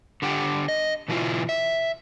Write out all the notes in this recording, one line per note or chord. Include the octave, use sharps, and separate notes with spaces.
D3 G4 F#5 G5
D#5
B2 E3 F#3 E4 F4
E5